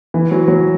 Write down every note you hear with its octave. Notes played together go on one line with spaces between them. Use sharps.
E3
F#3
F#3